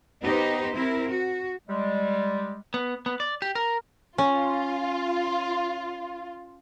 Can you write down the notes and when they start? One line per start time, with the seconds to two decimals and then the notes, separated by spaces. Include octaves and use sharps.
0.23 B3 D#4 G4 B4 C5
0.75 C4 E4 A#4
1.11 F#4
1.68 G3 G#3
2.74 B3
3.06 B3
3.20 D5
3.42 G4
3.55 A#4
4.18 C#4 F4